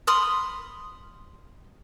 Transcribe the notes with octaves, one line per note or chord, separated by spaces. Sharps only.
B5 C6 D#6 F6